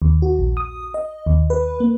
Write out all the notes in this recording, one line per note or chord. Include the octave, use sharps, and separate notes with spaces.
D#2
F#4
A#1
D#6
D#5
D#2
B4
A#3